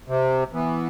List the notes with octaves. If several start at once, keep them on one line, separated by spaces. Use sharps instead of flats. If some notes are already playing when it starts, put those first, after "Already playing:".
C3
E3 B3